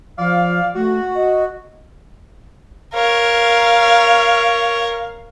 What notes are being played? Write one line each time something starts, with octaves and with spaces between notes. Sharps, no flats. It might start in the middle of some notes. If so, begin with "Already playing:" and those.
F3 F4 D5 F5
A3 F#4
D#5
A#4 C#5 F5